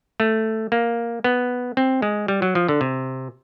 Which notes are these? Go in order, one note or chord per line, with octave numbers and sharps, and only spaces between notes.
A3
A#3
B3
C4
G#3
G3
F#3
F3
D3
C3